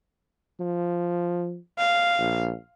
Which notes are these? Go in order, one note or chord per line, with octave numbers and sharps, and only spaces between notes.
F3
F5
A#1